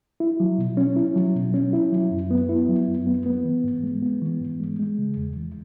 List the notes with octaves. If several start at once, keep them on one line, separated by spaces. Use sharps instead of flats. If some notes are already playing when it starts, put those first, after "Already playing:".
E4
F#3
B2
C#4
E4
F#3
B2
C#4
E4
F#3
F#2
B3
E4
F#3
F#2
B3
B3
E3
G#2
G#3
B3
E3
G#2
G#3
G#3
C#3
E2
E3